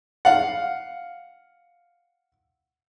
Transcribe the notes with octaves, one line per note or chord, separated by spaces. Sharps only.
F5 F#5